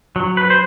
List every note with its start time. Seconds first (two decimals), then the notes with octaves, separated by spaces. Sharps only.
0.16 F#3
0.37 B4
0.50 C5